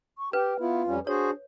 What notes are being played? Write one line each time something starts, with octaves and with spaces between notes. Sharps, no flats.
C#6
G4 B4 G5
B3 E4 F4
F2 G3 C#4
D4 F#4 G#4 C5 C#5